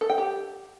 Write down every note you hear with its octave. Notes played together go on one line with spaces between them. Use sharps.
A4
G5
G4